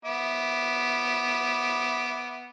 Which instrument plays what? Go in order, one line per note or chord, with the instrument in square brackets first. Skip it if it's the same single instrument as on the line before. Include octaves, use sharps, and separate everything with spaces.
[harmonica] B3 E5 D6